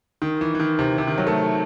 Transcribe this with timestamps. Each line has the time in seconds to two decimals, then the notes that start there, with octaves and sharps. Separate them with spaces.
0.22 D#3
0.41 E3
0.55 E3
0.60 D#3
0.79 C3
0.98 C3
1.07 D#3
1.18 F#3
1.27 A3